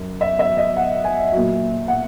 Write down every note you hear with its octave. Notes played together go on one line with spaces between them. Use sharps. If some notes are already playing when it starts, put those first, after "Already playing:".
Already playing: F#2
E5
E5
D#5
F#5
G#5
A#2 F#3
F#5